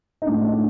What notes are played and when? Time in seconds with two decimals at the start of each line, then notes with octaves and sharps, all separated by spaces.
0.22 D#4
0.26 A2 D4
0.44 D4